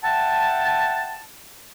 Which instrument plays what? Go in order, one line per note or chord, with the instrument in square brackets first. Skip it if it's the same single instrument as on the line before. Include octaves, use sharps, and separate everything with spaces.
[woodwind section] E5 F#5 G5 A5